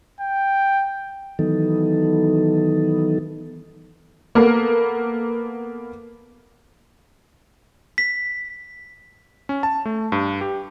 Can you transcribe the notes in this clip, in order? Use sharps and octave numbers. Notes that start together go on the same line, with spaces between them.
G5
D#3 E3 F#3 B3 D#4 A4
A#3 B3 A4 A#4
B6
C#4
A5
A3
G2
G4